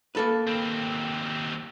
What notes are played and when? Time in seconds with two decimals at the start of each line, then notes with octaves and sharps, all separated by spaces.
0.15 A#3 A4 B4
0.47 D#2 C4